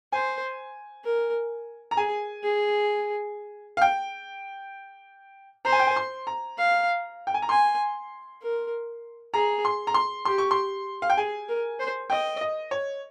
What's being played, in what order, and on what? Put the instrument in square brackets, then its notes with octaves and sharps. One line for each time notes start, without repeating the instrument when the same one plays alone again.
[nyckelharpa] C5 [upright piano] G#5
[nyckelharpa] A#4
[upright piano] A#5
[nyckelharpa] G#4 [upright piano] G#5
[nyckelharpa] G#4
[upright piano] F5
G5
[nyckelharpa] C5 [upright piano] A#5
[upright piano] G#5
G5
G#5
C6
A#5
[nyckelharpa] F5
[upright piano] G5
G#5
A#5
[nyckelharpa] G#5 [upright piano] C6
[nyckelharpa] A#4
[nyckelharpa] G#4 [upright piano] A#5
[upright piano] C6
A#5
C6
[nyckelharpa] G4 [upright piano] C6
[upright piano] C#6
C6
F5
G5
[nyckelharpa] G#4 [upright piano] G#5
[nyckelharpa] A#4
C5
[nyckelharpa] D#5 [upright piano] G5
[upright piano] D#5
C#5